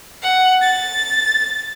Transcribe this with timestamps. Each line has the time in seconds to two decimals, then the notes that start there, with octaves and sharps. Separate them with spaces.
0.22 F#5
0.61 A6